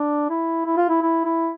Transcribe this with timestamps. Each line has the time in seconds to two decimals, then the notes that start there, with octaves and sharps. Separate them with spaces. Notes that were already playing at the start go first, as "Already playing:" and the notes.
Already playing: D4
0.30 E4
0.66 E4
0.77 F4
0.89 E4
1.02 E4
1.25 E4